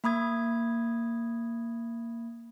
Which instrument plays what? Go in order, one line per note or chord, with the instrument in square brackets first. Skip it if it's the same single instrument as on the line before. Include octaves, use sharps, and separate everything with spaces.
[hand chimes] A#3 B5 D#6 G#6